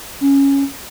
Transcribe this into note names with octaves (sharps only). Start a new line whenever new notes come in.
C#4